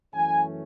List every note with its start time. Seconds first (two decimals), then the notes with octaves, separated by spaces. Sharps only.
0.13 F#2 E3 A3 C#4 G#5